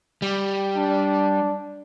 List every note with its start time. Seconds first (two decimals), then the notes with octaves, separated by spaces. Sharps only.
0.22 G3
0.77 D4